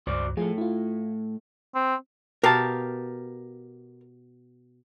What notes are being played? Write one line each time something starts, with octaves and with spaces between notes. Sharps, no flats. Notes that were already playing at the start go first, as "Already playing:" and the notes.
C#2 G2 F#4 C5 D5
A2 F3 A3 F4 G#4
E4 F4
C4
B2 G4 A#4 F5 A5